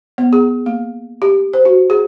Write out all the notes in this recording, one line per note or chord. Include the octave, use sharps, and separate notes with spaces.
B3
G#4
A#3
G4
C5
F#4
G#4